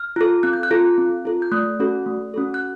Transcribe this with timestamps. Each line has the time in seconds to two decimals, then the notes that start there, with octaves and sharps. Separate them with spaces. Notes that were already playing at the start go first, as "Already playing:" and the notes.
Already playing: F6
0.16 F4 A4
0.43 C4 F#6
0.53 G6
0.63 F#6
0.71 F4 A4
0.98 C4
1.25 F4 A4
1.42 G6
1.52 A3 F#6
1.80 C#4 F#4 A4
2.06 A3
2.34 C#4 F#4 A4
2.54 F#6